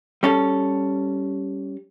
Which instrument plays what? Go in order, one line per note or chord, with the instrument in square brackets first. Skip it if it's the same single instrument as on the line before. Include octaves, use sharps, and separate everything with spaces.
[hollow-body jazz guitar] G3 C#4 A4